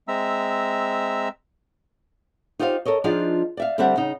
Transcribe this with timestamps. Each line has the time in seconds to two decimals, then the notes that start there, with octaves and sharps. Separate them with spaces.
0.08 G#3 C4 E5 A#5 E6
2.59 D#4 F4 G4 C5 D5 F5
2.85 A4 A#4 C#5 D#5
3.04 F3 D4 D#4 F4 G#4
3.57 D5 E5 F5
3.78 D3 G3 C4 A4 E5 F#5
3.97 C#3 D#4